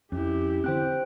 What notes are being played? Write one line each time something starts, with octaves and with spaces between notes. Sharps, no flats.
F2 C#4 E4 G4
D3 C4 C5 G5 F#6